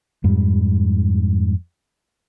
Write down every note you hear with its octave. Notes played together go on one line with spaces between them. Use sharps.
F2 G#2 G3